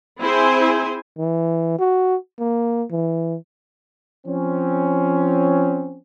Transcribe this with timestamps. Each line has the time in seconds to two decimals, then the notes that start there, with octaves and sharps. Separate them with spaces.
0.21 C4 E4 G#4 C5 G#5
1.18 E3
1.79 F#4
2.39 A#3
2.91 E3
4.27 F3 C4 C#4